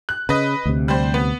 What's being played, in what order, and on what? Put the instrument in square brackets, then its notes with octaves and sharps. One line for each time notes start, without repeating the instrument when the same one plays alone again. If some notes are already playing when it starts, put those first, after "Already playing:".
[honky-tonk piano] F#6
[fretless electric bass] C#3 [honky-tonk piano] B4 D#5
[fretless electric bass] D2 C3
[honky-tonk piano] G3 C5
B3